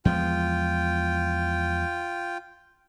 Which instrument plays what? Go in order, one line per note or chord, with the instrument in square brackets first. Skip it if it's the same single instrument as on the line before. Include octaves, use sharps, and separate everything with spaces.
[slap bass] E2 F3 G#3 [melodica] F4 G5